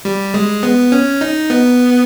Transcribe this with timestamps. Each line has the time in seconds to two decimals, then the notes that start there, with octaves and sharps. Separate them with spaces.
0.05 G3
0.34 G#3
0.63 B3
0.92 C#4
1.21 D#4
1.50 B3